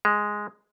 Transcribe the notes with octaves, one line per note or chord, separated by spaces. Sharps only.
G#3